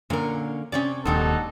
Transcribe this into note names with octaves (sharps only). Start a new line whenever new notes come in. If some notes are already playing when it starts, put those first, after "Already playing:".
A#2 D3 A#3 C#4 A#4
C3 C#4 C#5 D5
D#1 D#2 G#2 D4 D#4 F#4 G4 A4